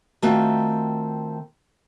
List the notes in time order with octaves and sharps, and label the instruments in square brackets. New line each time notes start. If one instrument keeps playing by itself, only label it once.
[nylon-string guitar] D#3 A3 C4 F4 F#4